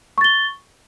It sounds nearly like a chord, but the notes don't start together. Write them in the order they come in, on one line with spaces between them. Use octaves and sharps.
C#6 A6 G7